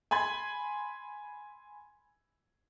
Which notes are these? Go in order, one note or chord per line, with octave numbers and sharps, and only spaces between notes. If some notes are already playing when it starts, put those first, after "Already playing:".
G#5 B5 C6 G#6